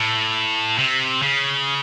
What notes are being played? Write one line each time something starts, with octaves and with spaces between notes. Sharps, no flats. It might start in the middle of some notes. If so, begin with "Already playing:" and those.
Already playing: A2
C3
C#3